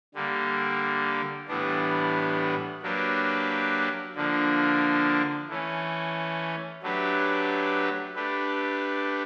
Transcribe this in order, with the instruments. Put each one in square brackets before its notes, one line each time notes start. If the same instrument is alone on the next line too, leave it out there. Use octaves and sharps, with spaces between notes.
[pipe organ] D3 G3 A#3
A2 E3 G3 B3 D4
F#3 A#3 D4 G4 B4
D3 F3 A#3 D4
E3 A3 C#4
F#3 A3 D4 G4 B4
A3 D4 G4 B4